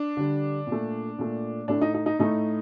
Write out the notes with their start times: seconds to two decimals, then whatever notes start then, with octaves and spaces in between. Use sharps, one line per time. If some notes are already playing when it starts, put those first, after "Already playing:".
Already playing: D4
0.17 D3 G3
0.67 A#2 A3
1.19 A#2 A3
1.68 A2 A3 D4
1.81 D#4
1.94 D#4
2.06 D#4
2.19 A2 A3 D#4